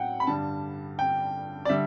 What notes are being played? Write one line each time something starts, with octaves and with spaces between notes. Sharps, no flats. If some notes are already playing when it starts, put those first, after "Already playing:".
Already playing: A2 F#3 F#5 G5
B5
G2 D3 G3 A5
G5
D5
D3 G3 E5